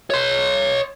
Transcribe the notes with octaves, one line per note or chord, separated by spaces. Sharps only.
C#5 C6